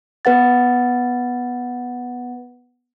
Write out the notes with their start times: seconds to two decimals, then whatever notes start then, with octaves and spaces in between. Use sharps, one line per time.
0.25 B3 B4 F#5 A6